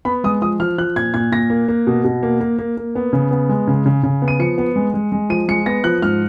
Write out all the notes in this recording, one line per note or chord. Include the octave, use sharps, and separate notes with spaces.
B3 B5
G#3 D#6
F3 D#6
F3 F6
F3 F#6
A#2 G#6
A#2 G#6
A#2 A#6
A#3
A#3
B2
B2
A#3
A#3
A#3
A#3
B3
C#3
B3
G#3
C#3
C#3
C#3
B3
D#7
F3 C#7
B3
G#3
G#3
G#3
F3 D#7
G#3 C#7
B3 A#6
F3 F#6
G#2 F6